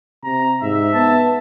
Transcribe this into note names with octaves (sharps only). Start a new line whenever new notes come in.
C3 A#5
G#2 E5
B3 A5